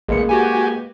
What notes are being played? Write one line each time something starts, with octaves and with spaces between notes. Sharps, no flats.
A1 G#3 A#3 B4 C#7
F#4 G4 G#5